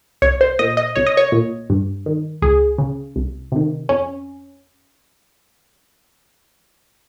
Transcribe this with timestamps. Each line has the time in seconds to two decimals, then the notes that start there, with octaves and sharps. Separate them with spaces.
0.22 C2 C#5
0.41 C5
0.59 A#2 D#5
0.77 D#5
0.96 C2 C#5
1.07 D#5
1.17 C#5
1.32 A#2
1.70 G2
2.06 D#3
2.42 C#2 G#4
2.78 C#3
3.16 C2
3.52 C3 D#3
3.89 F2 C#4